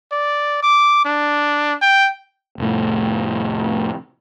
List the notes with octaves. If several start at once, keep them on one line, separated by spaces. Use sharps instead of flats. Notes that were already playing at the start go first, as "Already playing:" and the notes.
D5
D6
D4
G5
F1 A2